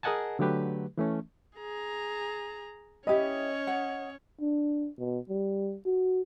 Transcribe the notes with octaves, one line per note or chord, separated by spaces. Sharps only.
G#4 A#4 D#5 F#5 G#5 A5
D3 F#3 A3 G4 B4
E3 A3 C#4
G#4 A#5
C#4 E4 G4 C#5 D#5
F#5
D4
B2
G3
F#4